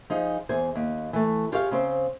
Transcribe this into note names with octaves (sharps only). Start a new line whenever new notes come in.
F3 D#4 G#4
E2 G#4 C5 G#5
D#2
E3 A3
F4 G4 G#4 C#5 D5 F5
C#3 C4 C5